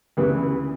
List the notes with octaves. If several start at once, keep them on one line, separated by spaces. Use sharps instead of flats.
D2 C#3 E3 B3 G4 B4